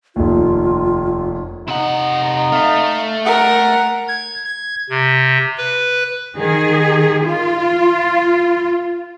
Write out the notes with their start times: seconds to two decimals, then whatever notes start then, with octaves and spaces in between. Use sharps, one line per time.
0.16 F1 D#2 F4
1.68 C3 D#4 F#5
2.52 A3 F5
3.26 A#4 F#5
4.08 G#6
4.45 G#6
4.90 C3
5.57 B4
6.36 D#3 G#4
7.23 F4